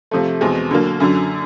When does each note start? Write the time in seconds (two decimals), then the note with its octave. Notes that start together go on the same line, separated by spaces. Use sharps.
0.11 C3 F3 A3
0.41 E2 B2 G#3 C4
0.71 D3 F#3 A#3
1.00 F#2 D3 F#3